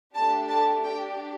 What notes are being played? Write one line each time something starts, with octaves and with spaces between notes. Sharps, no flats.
A3 D4 G4 A5
A5
D4 G4 G5